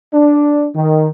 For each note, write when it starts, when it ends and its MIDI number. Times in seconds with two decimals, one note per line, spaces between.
0.13 0.67 62
0.75 1.09 51